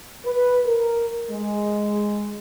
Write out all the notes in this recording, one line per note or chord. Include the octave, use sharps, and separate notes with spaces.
B4
A#4
G#3